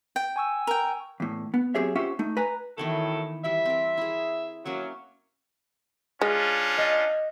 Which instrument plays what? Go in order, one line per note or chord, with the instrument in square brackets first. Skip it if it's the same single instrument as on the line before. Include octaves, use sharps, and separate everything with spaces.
[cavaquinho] G5
[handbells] G#5 C#6 E6
[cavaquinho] A#4 G5
[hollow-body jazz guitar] E2 A2
B3
F#3 C4 G4 G#4 C#5 E5
C#4 F4 G4 C5 E5 F#5
A3 D#4
B4 G#5 A#5
[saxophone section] F#2 A2 A4 [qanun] D#3 E3 B3
[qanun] E3 G3 [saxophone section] E5
[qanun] C4 A#4
E4 G#4
[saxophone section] F#3 [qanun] A#3 C#4 E5
[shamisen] G#3 [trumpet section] C#4 D4 F4
[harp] D#5 G6